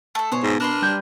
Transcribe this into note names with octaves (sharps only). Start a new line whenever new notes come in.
A3 A4
B2 G#4 C5 C#5
G#2
D4 A#4 B4 C6
G3 G6